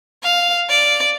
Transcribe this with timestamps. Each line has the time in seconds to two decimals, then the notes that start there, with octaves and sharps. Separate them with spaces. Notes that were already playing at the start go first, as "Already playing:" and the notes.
0.23 F5
0.69 D5